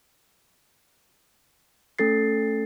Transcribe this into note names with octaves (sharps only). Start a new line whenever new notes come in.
A3 C#4 A4 A6 C7